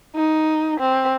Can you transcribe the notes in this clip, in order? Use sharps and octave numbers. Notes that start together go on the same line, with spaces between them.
D#4
C4